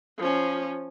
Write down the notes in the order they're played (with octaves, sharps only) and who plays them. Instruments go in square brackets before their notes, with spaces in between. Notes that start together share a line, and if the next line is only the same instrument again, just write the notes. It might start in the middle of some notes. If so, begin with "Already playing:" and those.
[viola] F3 C#4